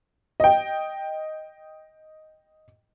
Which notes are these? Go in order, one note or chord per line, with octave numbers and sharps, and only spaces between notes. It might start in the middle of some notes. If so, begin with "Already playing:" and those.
D#5 G5